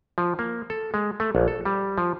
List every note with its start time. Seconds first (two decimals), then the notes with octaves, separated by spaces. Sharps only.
0.18 F3
0.39 A#3
0.70 A4
0.94 G#3
1.20 A3
1.35 A#1
1.48 A4
1.65 G3
1.98 F3